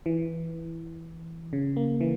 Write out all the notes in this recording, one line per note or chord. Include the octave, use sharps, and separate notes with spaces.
E3
C#3
A#3
E3